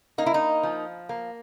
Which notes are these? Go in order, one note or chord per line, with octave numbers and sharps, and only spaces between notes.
A#3 D#4
E4
D#4
F3
A#3